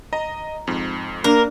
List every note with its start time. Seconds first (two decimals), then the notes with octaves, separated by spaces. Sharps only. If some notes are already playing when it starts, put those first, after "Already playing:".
0.13 D#5 A#5
0.67 F2 G#2
1.24 A#3 D4 A#4